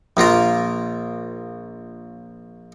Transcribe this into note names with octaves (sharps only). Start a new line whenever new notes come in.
A#1 A#3 F4 A#4